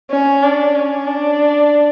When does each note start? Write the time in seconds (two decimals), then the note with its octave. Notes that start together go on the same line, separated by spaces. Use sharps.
0.11 C#4
0.43 D4
0.75 C#4
1.07 D4